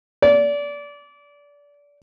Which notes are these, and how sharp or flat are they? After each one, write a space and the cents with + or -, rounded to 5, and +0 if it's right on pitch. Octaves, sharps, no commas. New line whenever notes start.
D5 -25